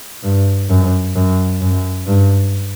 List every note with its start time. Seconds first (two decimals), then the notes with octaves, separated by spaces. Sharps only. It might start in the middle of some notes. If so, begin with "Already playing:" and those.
0.23 G2
0.70 F#2
1.16 F#2
1.62 F#2
2.07 G2